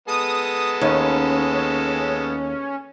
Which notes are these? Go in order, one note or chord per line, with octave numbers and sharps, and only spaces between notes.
G#3 B3 A4 D#6
D#2 C#4